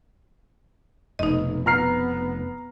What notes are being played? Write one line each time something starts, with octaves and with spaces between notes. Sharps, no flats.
F1 B1 D#4 D#5
B3 A#5 F6 C7